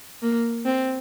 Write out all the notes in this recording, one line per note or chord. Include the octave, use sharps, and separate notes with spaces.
A#3
C4